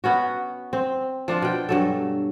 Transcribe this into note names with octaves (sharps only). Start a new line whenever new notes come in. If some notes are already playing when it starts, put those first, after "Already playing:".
B3 C#4 F#4
C4
F3 D4 F4
B2 G5
G2 F#3 A4